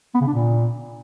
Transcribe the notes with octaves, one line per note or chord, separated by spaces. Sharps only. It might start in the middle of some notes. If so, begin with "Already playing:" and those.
B3
C#3
D4
A#2